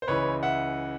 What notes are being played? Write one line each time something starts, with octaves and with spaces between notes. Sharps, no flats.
C5
C#2 C#3 E3 B4 C#5
E5 F#5